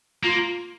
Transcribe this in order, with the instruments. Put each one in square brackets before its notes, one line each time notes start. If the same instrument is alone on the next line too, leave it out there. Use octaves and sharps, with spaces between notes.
[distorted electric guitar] A#3 [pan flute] F4